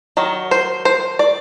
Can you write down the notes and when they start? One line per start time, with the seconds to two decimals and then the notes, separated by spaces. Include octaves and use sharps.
0.17 D#3 F#3
0.51 C5
0.85 C5
1.19 D5